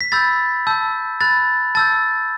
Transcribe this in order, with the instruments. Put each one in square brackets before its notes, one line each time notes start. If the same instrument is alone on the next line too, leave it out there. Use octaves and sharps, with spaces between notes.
[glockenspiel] B6
B5 E6 G6 A6
A5 E6 G6
B5 F#6 A6
A5 E6 G6 A6